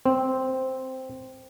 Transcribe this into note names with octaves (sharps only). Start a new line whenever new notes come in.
C4